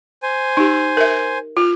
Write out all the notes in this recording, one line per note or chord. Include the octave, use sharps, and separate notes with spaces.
C5 G#5
D#4 G4
A#4 E5
F4 F6